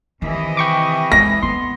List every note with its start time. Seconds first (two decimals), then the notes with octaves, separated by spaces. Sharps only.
0.22 C3 D#3 E3 D#5
0.57 G5 C#6 D6
1.12 G#3 A#6
1.43 D3 B3 C6